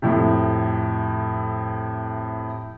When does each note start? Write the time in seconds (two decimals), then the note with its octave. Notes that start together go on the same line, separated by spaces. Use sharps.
0.02 F2 A2 C3